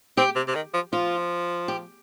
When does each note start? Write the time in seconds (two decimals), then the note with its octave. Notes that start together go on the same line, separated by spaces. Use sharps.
0.17 C4 G4
0.36 C3
0.48 C3
0.55 D#3
0.74 F3
0.93 F3 F4
1.68 G4